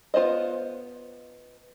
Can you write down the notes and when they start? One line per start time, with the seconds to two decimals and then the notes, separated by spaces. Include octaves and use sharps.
0.14 B3 F4 C5 D5 D#5